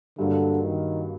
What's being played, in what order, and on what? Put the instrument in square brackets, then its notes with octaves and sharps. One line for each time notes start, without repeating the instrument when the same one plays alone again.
[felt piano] G2 F#3 A#3 [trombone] D3
[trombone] D#3